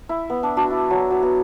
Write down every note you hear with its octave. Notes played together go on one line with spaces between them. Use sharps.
E4
B3
D4
D4 F#4
E4
F#3
F#3
B3